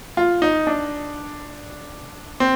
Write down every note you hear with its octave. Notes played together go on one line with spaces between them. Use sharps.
F4
D#4
D4
C4